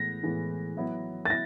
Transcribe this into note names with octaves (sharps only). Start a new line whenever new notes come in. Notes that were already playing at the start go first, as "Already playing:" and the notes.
Already playing: A2 E3 G#3 B3 A#6
A2 E3 G#3 B3
F#3 B3 E4
A6
B3 E4 A#6